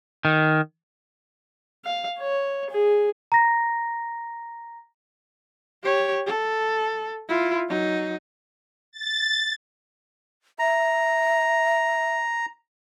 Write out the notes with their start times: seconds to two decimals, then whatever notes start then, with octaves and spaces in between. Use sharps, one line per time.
0.25 D#3
1.85 F5
2.19 C#5
2.70 G#4
3.32 A#5 A#6
5.83 G4 C#5
6.26 A4
7.29 E4 F4
7.69 F#3 D#4
8.92 A6
10.59 E5 A#5